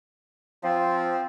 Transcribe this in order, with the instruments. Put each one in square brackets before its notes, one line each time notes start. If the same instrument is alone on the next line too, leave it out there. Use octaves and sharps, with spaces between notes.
[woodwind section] F3 [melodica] C4